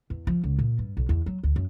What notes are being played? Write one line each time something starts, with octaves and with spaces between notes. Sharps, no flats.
E2
F3
C#2
A#2
G2
B1
E2
F#3
D2
F#2